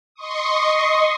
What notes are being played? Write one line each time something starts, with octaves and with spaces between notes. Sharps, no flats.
D#5 C6 C#6 D#6